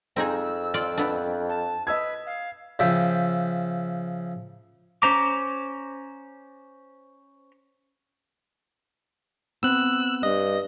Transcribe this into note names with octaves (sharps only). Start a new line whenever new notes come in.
F2 C4 D#4 G#4 E6
F4 D5
B3 D4
A5
B4 D#5 E6 G#6
F5
C#3 F3 E5 G5
C#4 C5 A#5 D6
B3 C4 E6 F#6
G2 D#5